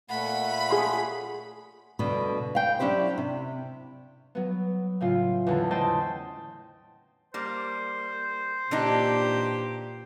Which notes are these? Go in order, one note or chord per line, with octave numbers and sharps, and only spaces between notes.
A#2 A3 F#5 B5
G#4 C6
D2 G2 B2 D3
F5 G5
F#3 C#4 D4 E4 G4 C5
C3
F#3 B3
A2 C#3 F4
E2 D3 A4
A3 C#4 C5 D#5 G5 A5
G3 A#3 C5
A#2 E3 D4 D#4 G4